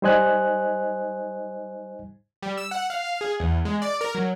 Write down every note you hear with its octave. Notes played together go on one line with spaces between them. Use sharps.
G3 D#4 C5 D#5 G#5 F#6
G3
E6
F#5
F5
G#4
E2
G#3
D5
A#4
F#3